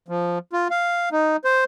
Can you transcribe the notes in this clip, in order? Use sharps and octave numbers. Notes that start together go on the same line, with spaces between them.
F3
F4
F5
D#4
C5